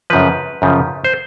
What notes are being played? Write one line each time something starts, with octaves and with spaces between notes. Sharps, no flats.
F#2 C#3 F3 B4
F#2 C#3 F3
C5